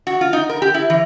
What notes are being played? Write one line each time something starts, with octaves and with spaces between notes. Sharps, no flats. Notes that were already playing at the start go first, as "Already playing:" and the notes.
F#4
F4
D#4
A#4
G4
E4
E3